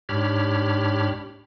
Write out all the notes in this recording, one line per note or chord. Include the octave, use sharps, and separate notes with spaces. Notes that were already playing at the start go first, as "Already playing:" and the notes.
G#2 D4 G4 C#5 B5 F6